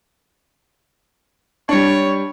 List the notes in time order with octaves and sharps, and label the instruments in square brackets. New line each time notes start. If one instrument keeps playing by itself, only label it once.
[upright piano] G3 D4 [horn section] C#5